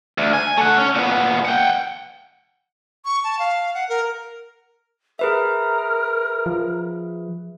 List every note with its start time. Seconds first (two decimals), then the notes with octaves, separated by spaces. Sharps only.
0.18 D2
0.33 G#5
0.57 A3 F#5
0.78 C#4
0.95 A#2 B3
1.45 F#5 G5
3.05 C#6
3.24 A5
3.39 F5
3.74 F#5
3.89 A#4
5.19 G#4 A#4 B4 E5
6.46 F3